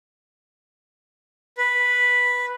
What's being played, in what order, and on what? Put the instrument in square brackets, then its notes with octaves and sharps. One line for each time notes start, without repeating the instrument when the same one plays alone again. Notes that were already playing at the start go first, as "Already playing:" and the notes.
[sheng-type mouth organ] B4